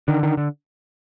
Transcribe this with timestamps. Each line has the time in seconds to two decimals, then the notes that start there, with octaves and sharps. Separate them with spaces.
0.08 D3 D#3
0.23 D#3
0.37 D3